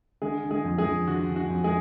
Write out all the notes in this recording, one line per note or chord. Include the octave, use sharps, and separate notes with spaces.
D3 G#3 G#4
D3
G#3 G#4
F2
G#3 G#4
F2
D3 F#4
D3
F#4
F2
G#3 G#4